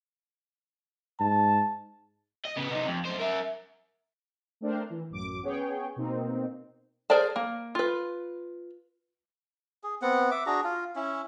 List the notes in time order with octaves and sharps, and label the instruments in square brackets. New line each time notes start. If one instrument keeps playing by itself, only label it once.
[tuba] G#2 [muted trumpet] A5
[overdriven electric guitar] D#5
C#3 B3
C3 D#4
F2
F#2 C5
A#4 E5
[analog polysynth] A3 C4 D4 A#4 C5
E3
A1 F#2 D6
B3 C#4 G#4 C#5 G5
B2 A#3 C4 D#4
[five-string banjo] G#4 A#4 C5 D5 A5
A#3
F4 B4
[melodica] G#4
B3 C4 F#5
E5 D6
D4 F#4 G#4 A#5
F4
C#4 E4